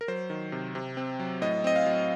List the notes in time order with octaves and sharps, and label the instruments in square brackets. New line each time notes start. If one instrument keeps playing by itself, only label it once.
[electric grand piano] A#4
F#3 C5
D#3
C3
C3
C4
F#3
A2 D#5
C4 D#5
F5
F#3